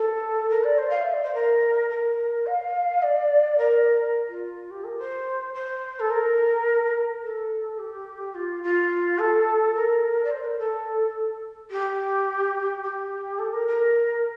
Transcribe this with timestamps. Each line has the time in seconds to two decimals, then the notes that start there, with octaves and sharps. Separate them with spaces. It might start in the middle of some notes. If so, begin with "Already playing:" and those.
Already playing: A4
0.49 A#4
0.63 D5
0.77 C5
0.89 F5
1.01 E5
1.12 D5
1.23 C5
1.34 A#4
1.89 A#4
2.46 F5
3.02 D5
3.58 A#4
4.28 F4
4.70 G4
4.84 A#4
4.98 C5
5.54 C5
5.99 A4
6.10 A#4
7.22 A4
7.78 G4
8.34 F4
8.62 F4
9.18 A4
9.74 A#4
10.24 D5
10.30 C5
10.44 A#4
10.58 A4
11.70 G4
12.83 G4
13.38 A4
13.53 A#4
13.67 A#4